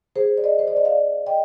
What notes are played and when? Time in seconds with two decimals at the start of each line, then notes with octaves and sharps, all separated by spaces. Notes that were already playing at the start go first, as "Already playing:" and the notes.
0.16 G#4 C5
0.37 D5
0.44 C5 D#5
0.59 C5
0.67 D5
0.76 D#5
0.85 D5 F5
1.27 D#5 G5